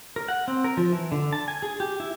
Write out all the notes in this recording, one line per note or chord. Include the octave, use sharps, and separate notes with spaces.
A#4
F#5
C4
A#4
F3
E3
D3
A5
G#5
G#4
G4
E4